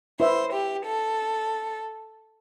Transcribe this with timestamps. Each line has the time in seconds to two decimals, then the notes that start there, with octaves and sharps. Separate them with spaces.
0.20 E4 B4 C5 E5
0.53 G4
0.85 A4